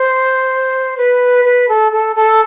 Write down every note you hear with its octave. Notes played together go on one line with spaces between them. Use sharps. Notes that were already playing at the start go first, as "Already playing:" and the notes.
Already playing: C5
B4
B4
A4
A4
A4